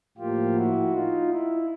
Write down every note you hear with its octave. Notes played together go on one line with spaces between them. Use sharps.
A2 F3 A#3 F4 G4
E4 F#4
D#4 F4
E4